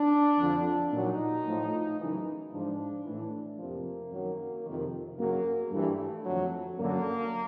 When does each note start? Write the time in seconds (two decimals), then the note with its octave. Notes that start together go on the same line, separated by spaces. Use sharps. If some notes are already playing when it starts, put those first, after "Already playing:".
Already playing: D4
0.39 F2 D3 F3
0.92 A#2 F#3 D#4
1.45 A2 F3
1.99 F#2 C#3 E3
2.52 G#2 F3 D4
3.06 A2 E3
3.59 F2 C3 F3 A#3
4.11 F#2 D#3 F#3
4.65 F2 C3 D#3
5.18 F#2 C#3 F#3 A#3
5.72 G2 E3 A3
6.25 F2 D3 F#3
6.78 F#2 D3 F#3 A#3